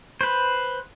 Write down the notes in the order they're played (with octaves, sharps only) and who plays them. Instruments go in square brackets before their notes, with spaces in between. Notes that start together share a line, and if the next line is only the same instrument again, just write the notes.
[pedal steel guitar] B4 C5